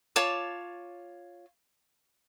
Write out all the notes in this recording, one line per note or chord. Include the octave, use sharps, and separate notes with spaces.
F4 C#5 A5 D6